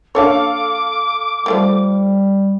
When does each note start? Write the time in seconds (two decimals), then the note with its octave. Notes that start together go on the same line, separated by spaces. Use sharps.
0.15 A#3 D4 A4 C#5 F5 D6
1.46 F3 G3 A3 A#3